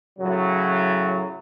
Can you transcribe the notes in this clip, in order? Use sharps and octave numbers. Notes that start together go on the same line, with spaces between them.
A2 C#3 F#3